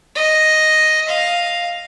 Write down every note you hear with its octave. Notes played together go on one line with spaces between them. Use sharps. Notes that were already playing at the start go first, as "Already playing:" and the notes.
D#5
F5